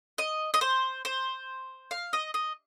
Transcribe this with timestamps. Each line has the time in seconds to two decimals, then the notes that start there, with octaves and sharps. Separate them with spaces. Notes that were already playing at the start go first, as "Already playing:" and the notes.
0.18 D#5
0.54 D#5
0.61 C5
1.05 C5
1.91 F5
2.13 D#5
2.34 D#5